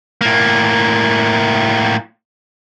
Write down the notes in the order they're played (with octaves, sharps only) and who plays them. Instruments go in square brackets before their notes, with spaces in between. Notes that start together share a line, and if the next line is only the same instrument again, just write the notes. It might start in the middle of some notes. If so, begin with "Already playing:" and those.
[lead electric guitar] A2 A#3